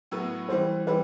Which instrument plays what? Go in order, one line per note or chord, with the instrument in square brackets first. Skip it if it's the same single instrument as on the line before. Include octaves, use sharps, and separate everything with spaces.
[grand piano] A2 F#3 B3
[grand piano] E3 G3 C4 [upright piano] C5
[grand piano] E3 G3 C4 [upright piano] B4